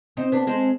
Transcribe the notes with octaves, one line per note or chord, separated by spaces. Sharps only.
C4 D#4
B3 D4
G#3 C4